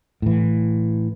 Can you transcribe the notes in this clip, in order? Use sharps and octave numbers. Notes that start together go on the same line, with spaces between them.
A2 E3